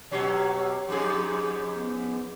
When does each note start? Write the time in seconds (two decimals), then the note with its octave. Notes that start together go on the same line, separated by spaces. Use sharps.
0.11 B2 F#3 C#4 G4
0.89 F2 G#2 G#4
1.74 B3